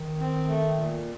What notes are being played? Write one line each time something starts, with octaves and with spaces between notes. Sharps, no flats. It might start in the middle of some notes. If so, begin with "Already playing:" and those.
Already playing: D#3
C4
A3
A#2